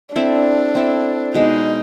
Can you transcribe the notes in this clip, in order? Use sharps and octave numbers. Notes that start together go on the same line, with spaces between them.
C4 D4 E4 A4
C4 E4 A4
B2 G#3 B3 D4 D#4